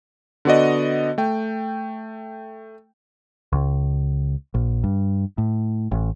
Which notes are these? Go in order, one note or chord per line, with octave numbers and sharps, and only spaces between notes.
D3 B3 F#4 D5 D#5
A3 G5
C#2
A#1
G2
A2
A1